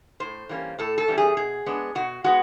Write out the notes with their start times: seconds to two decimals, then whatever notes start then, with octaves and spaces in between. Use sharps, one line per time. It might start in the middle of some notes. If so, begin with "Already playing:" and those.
0.20 A2 C5
0.49 E3 G3 A#3 C#4
0.79 A2 A4
0.98 A4
1.08 E3 G3 A#3 C#4
1.18 G#4
1.37 B2 G#4
1.66 G#3 B3 D4
1.95 B2 F#4
2.24 G#3 B3 F#4